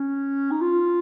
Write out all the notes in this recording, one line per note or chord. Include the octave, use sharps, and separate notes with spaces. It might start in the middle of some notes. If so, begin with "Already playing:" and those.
Already playing: C#4
D#4
F4